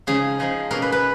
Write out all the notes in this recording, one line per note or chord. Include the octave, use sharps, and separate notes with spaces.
C#3 F3 G#3 D#4 G#4
C#3 F3 G#3 D#4
B2 A#3 C#4 A#4
B4
B4